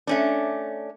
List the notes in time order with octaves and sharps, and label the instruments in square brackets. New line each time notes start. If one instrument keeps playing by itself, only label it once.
[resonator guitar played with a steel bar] A3 C#4 D4